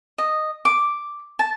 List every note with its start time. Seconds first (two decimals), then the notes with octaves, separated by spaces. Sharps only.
0.18 D#5
0.65 D6
1.39 A5